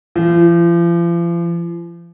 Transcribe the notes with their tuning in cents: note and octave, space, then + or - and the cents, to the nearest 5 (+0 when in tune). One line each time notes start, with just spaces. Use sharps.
F3 -40